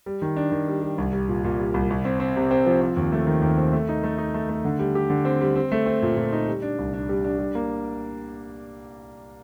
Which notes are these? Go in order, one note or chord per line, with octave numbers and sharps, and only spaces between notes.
G3
D#3
D4
D#3
G3
G3
C2
G3
A#2
A#2
G3
C2
C2
C4
C4
C3
C4
F3
C4
D#2
A3
D#3
D#2
C4
A3
D#4
A3
D#4
A3
A3
D3
G3
G4
D3
C4
G3
C4
A3
C4
A#2
A#2
D#4
G3
D4
C2
D4
G3
D4
G3
A#3